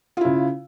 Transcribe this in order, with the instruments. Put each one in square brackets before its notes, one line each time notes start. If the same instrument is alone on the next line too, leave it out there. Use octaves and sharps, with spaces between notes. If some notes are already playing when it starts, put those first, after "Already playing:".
[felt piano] F4
E4
C#3